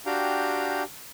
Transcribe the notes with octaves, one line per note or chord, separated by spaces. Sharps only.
D4 F#4 G4 F5 G5 A#5